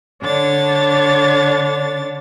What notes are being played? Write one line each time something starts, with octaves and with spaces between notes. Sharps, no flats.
D3 D4 C#5 A6